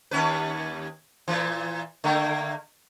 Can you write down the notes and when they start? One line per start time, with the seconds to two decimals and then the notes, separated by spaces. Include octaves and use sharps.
0.11 D#2 C#4 B4
1.28 A#2 E3
2.04 D3 A3 A#3